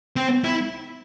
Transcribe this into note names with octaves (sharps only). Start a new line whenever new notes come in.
C4
E4